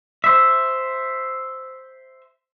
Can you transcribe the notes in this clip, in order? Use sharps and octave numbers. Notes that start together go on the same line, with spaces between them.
C5 E5